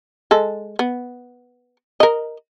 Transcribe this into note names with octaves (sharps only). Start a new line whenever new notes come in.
G#3 A4
B3
A#4 D#5